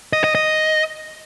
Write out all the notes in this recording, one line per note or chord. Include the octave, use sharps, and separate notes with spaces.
D#5
D#5
D#5